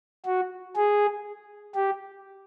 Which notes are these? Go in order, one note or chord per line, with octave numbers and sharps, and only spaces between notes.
F#4
G#4
G4